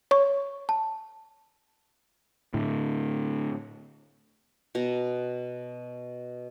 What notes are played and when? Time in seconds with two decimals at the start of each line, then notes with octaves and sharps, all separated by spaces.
0.11 C#5 C#6
0.69 A5
2.54 A2 D3
4.75 B2 A#5